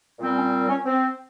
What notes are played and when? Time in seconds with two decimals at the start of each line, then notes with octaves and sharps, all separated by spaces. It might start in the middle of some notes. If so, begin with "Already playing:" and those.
0.19 A#2 G3 C4
0.36 C#4
0.68 C#4
0.85 C4